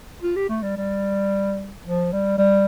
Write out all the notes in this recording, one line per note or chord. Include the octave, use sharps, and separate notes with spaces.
F4
G4
A3
G3
G3
F3
G3
G3